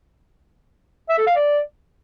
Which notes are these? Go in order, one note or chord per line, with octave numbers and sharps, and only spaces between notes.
E5
A4
F5
D5